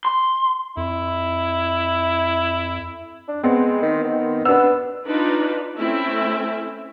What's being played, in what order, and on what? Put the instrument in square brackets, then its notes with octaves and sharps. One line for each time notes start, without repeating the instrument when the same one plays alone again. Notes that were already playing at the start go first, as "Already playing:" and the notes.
[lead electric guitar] C6
[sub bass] F2 [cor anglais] E4
[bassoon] D4
[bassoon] G#3 [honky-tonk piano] B3 C4
[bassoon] D#3
D#3
[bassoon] B3 [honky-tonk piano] D4 B4 E6
[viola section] D4 D#4 F4 B4
A3 C4 C#4 E4 E5